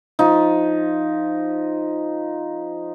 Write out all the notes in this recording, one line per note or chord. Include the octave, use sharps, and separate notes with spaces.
F3 D#4